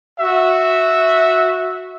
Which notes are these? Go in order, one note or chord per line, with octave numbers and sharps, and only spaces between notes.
F#4 E5